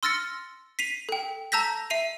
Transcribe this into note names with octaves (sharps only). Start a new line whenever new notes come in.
C6 E6 F6 A6 A#6 C#7
B6 C7 D#7 F7
A4 G5
A5 A#5 E6 G6 A#6 B6
E5 C7 D#7 F7